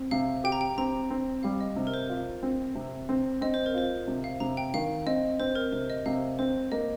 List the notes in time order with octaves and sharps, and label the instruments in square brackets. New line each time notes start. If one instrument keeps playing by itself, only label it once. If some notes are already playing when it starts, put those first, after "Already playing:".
Already playing: [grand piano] C4
[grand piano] C3 [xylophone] F5
[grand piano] G4 [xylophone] G5
[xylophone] A#5
G5
[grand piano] C4 [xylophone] A#5
[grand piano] C4
[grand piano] G3 [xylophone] F5
[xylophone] D#5
[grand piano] C3
[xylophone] A#4
C5
[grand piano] F4
C4
C3
C4
[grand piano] C4 [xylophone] D#5
[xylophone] C5
A#4
[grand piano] F4 [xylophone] C5
[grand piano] C3
[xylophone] F5
[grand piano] C3 [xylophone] A#5
[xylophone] G5
[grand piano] D#3 [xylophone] F5
[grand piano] C4 [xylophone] D#5
[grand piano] C4 [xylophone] C5
[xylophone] A#4
[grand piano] C3 [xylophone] C5
[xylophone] D#5
[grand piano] C3 [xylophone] F5
[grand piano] C4 [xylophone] C5
[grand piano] A#3 [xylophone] D#5